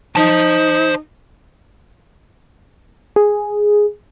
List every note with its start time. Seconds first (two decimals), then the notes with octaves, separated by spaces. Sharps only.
0.16 D#4 C5 A5
3.16 G#4